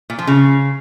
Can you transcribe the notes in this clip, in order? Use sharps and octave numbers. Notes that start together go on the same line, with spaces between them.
A#2
F3
C#3